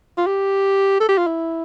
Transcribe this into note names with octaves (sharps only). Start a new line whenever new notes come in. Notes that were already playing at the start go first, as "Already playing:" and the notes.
F4
G4
A4
G4
F4
E4